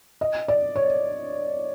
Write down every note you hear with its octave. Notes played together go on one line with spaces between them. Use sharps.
D#5
D5
C#5